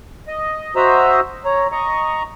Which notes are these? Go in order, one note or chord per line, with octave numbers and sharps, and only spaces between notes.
D#5
F#4 C5 D#5 E5 A#5 E6
C#5 A#5
D#5 A#5 C#6